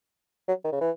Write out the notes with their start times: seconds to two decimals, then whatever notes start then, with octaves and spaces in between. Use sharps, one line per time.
0.48 F#3
0.65 D#3
0.72 C#3
0.81 E3